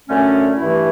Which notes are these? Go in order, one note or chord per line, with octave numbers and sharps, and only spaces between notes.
F#2 D3 A3 C#4
G2 E3 A3 E4